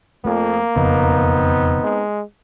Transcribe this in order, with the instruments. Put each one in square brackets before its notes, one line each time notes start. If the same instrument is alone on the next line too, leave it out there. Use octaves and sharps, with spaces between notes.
[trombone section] F2 [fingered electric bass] A3 [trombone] A#3
[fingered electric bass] E1 F2 C#3 [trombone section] B3 C4 D#4
[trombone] G#3